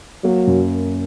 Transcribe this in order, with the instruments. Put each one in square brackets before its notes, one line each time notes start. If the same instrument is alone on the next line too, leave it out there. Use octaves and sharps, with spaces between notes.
[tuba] F#3 [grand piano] A#3
[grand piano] F#2